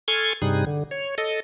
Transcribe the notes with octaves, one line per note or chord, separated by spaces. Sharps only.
A4 G#5 C6 C#6 F6 G#6
G2 C3 G3 D#4 G#4 F#6
D3
C#5
A4 D#5